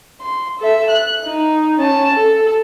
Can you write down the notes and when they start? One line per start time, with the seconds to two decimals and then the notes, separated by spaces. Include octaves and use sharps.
0.21 C6
0.59 A4 E5
0.90 F#6
1.26 D#4
1.80 C#4 A5
2.14 A4